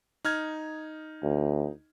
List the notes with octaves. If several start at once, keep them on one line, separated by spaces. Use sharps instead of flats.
D#4 F6 G#6
D2